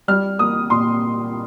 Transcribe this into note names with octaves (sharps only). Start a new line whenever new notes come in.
G3 F6
A#3 D#6
A#2 C6